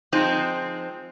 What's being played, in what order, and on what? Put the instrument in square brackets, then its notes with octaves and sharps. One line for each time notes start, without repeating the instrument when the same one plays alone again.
[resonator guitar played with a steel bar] F3 G#3 C4 D#4